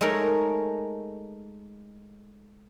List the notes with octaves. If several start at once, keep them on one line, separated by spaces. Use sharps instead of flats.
G#3 A3 D#4 A#4 C#5